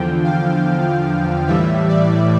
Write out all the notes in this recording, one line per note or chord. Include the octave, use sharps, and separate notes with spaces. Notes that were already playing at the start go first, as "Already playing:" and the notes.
Already playing: E2 D3 F3 G5
F5
A2 E3 G3 E5
D5